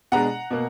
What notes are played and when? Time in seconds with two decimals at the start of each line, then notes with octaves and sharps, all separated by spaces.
0.12 B2 G#3 D4 F#5 A#5
0.51 B2 A#3